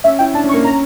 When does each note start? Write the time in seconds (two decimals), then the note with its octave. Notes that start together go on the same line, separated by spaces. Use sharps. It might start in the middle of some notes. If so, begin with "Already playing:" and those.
0.04 C#4 E5
0.19 E4 G5
0.34 D4 A5
0.44 C#4
0.49 C#6
0.54 A#3
0.64 C#4 A#5